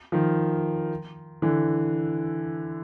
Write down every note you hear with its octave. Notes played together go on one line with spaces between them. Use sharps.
D#3 F3
D3 E3